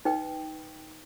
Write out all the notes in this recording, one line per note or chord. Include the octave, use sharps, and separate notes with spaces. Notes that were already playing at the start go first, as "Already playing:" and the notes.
D#4 B4 G5